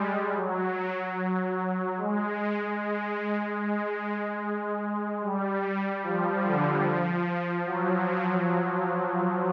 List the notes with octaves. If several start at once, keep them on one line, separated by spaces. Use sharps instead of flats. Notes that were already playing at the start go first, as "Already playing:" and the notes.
Already playing: G3 G#3
F#3
G#3
G#3
G#3
G3
F3
D3
F3
F#3